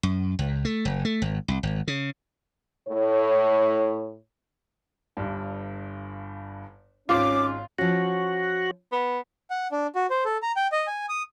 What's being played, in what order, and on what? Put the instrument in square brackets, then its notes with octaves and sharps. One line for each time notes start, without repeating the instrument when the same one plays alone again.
[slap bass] F#2
C#2
A3
F#1
A3
G#1
C2
G#1
C#3
[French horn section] A2 C#5
[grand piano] G1 G2
[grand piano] G#1 G#2 [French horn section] C#4 [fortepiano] F4 [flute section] D6
[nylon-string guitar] F3 C#4 [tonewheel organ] F#4
[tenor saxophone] B3
[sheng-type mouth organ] F#5
D4
F#4
C5
A4
A#5
G5
D#5
G#5
D#6